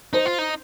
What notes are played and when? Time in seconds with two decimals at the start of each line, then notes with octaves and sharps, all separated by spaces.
0.13 D#4 C5
0.26 F4
0.39 D#4